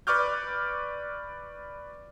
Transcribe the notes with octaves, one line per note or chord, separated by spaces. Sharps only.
B4 D5 C#6 D6 F6 G6